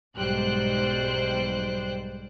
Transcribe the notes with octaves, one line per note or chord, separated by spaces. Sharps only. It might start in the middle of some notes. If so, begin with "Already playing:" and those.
B1 G#2 G3 C5 G5 F#6